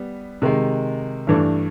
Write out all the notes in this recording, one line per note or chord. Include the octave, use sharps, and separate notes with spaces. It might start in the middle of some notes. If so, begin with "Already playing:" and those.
Already playing: G3 B3
C3 D#3 G#3
G2 E3 A3 D4